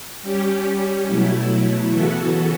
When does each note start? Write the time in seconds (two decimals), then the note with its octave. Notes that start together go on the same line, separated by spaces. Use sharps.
0.22 G3 C#4 G4
1.06 B2 F#3 A3 E4
1.90 C#3 E3 B3 F#4 A4